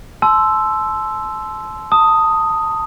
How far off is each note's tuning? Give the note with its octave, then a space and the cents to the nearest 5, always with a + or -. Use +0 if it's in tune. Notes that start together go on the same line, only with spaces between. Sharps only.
A5 -35 C6 -5 E6 +0
A5 +25 D#6 +5